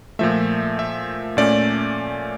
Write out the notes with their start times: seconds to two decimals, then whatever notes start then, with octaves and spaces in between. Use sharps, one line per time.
0.19 A#2 F3 A3 E5
0.79 E5
1.37 A#2 A3 C#4 D5